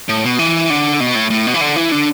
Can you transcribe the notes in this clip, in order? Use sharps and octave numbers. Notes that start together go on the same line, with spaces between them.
A2
B2
E3
D3
B2
A2
A2
B2
E3
D3
E3
D3